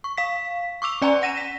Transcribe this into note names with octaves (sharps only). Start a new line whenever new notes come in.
C#6
F5 B6
C#6 D6 E6 F7
C#4 D5 G#5 A#5
F#5 A#6 D#7 E7
B6